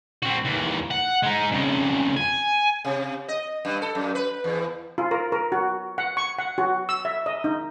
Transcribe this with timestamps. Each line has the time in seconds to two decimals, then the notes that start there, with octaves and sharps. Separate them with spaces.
0.23 C4 F#4
0.45 D#2 E3
0.91 F#5
1.23 G#3 D#4
1.52 F2 C#3
2.17 G#5
2.85 C3
3.28 D#5
3.65 G2
3.82 A4
3.95 F#2
4.15 B4
4.44 E2
4.98 F4
5.11 A#4
5.32 A#4
5.52 F#4
5.98 F#5
6.17 C#6
6.38 F#5
6.58 F#4
6.89 E6
7.05 E5
7.26 D#5
7.44 D#4